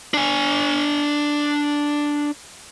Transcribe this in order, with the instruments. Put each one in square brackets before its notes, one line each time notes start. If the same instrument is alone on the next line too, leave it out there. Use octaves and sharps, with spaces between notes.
[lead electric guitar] D4 G#5